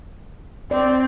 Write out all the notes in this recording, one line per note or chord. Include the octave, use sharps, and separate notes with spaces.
C4 D5